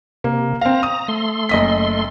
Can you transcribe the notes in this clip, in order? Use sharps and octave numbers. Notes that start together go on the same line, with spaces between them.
C3 A#3
C4 F5 A#5
D#6
A3 C6
F#1 D#5 B6